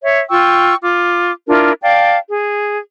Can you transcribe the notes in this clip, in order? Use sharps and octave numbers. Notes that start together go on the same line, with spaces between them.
C#5 E5
F4 G5 C#6 E6
F4 D6
D4 E4 F4 A#4
D5 F5 G5 A5
G#4